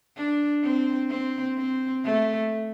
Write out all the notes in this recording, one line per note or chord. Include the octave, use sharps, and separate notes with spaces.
D4
C4
C4
C4
A3